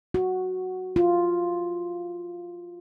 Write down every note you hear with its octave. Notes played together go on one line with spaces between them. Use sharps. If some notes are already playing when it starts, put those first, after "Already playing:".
F#4
F4